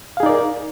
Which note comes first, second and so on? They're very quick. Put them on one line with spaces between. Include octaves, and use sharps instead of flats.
F5 G#4 D#4 D5 A#4